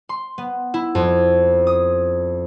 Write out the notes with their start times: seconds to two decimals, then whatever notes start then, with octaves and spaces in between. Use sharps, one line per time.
0.09 C6
0.38 B3
0.74 E4
0.95 F2
1.67 D#6